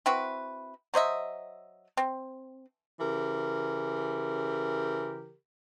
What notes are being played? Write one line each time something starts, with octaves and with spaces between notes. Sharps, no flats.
C4 E4 F#4 B4
F#3 C5 D#5 E5
C4
C#3 E3 G4 A#4